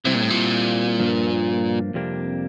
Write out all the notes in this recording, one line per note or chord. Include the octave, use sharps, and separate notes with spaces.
C3 G3 C4 E4
A#2
A2
A#2
G2 F3 A#3 D4
F2 C3 G3 A#3 D4